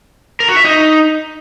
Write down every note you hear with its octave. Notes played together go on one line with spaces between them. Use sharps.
A#4
F#4
E5
D#4